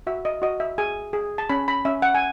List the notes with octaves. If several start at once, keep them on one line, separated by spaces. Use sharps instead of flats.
F#4 E5
D#5
F#4 D#5
E5
G#4 G#5
G#4
A5
C#4 B5
B5
C#4 E5
F#5
G#5